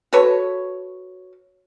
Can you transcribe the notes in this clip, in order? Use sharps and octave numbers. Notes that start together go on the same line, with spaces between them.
F#4 A4 B4 C#5